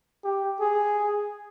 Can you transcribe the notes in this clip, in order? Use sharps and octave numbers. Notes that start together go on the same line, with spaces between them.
G4
G#4